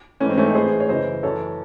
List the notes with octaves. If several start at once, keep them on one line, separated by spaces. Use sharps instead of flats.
G#2 E3 A3 C#4
C4
A3 C#4
C4 D#4
A2 E3 G#4 C5
C#5
F#2 C#3 E3 C5 D#5
F#2 E3 A4 C#5